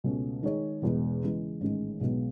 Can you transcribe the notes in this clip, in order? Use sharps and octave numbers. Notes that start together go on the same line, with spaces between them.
C#2 B2 A3 C#4
D#3 G#3 D#4 G#4 C#5
E1 E2 B2 G#3
C#3 E3 G#3
A1 G#2 D#3 G#3
B1 B2 G#3 B3